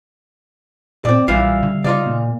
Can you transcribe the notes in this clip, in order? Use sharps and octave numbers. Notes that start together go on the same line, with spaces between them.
A#2 C4 D5
B1 A#2 E3 G3 F4 E5 F5
D3
C#3 D#4 F4 D5
A#2